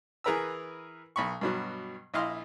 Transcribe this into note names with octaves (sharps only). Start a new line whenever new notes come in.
E3 G#4 A#4 B4 A#5 E6
B1 B5 C#6
G2 B2 F#3
A#1 E4 D#5 F5 C6